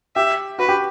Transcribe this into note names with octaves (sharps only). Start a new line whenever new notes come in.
G4 E5
F#4 B4
G4